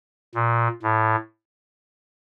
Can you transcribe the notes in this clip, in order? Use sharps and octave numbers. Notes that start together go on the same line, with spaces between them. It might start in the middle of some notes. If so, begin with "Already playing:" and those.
A#2
A2